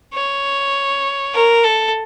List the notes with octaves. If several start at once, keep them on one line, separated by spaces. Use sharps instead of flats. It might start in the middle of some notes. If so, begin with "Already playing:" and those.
C#5
A#4
A4